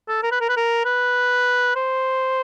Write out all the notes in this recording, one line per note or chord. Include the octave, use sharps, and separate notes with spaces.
A4
A#4
B4
A#4
B4
A#4
B4
C5